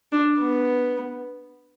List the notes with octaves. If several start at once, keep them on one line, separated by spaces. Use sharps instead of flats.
D4
B3